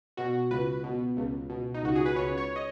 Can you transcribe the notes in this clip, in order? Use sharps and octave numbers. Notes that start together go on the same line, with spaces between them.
B2 F#4
C#2 B4
B2
C#2
B2
D#4
C#2 F#4
G#4
B4
C#2 C#5
C#5
D#5